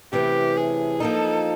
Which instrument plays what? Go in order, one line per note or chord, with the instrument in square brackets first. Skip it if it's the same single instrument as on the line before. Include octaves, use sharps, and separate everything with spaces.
[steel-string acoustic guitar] C3 E3 A3 C#4 [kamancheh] G4
[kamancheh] G#4
[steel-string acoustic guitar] F3 A#3 D#4 [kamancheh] A4